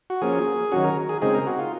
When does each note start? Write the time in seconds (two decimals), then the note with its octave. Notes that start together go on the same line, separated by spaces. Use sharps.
0.10 F#4
0.22 F3 A#3 C#4 G#4
0.72 D#3 F#3 C#4 F#4
0.84 A#4
1.09 G#4
1.22 C#3 G#3 C4 D#4 G#4
1.35 A#4
1.47 F#4
1.59 F4